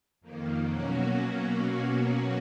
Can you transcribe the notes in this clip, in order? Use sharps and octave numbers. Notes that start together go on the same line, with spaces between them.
F2 D#3 A#3
B2 F#3 A#3 C#4 F#4